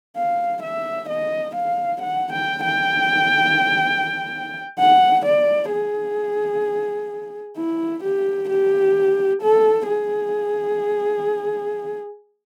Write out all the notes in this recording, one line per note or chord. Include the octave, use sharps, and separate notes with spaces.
F5
E5
D#5
F5
F#5
G5
G5
F#5
D5
G#4
E4
G4
G4
A4
G#4